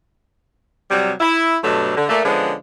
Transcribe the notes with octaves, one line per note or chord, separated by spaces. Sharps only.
C3 F#3 G3
E4
G2 B2 F#3 A3
D3
A#2 A3
D3 F3 G#3 B3 C#4